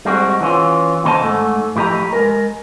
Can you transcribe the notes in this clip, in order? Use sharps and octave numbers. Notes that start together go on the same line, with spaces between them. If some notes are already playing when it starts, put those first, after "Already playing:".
G3 G#3 C4 F#4
E3 C#4 F4
D#2 C#3 C5 D#5 A5
G#2 A3
A2 F3 G4 D#5 A#5
G#3 A#4